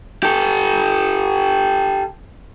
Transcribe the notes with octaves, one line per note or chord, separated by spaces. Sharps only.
G4 A4